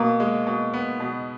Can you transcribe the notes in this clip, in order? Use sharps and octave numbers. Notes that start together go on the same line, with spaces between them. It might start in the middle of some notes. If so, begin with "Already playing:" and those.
Already playing: B2 A#3
G#3
B2
B3
B2